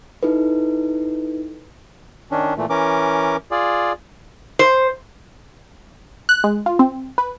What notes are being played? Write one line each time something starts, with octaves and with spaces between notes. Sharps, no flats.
D#4 E4 A4 B4
D#3 C#4 D4
A#2 E3 A3
E3 C#4 A#4 D6
F4 G#4 D5
C5
F#6
G#3
F4
C4
B4